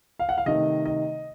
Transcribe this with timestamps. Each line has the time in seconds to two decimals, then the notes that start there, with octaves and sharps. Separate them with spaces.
0.19 F5
0.29 F#5
0.38 F5
0.46 C3 D#3 A3 D#5
0.85 D#5